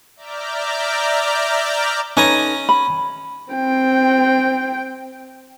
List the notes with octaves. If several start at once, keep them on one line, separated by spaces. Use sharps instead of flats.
D5 E5 A#5 D6 F6 G6
C#4 D#4 A4 B4 G#5 A#5
B5
C4 G5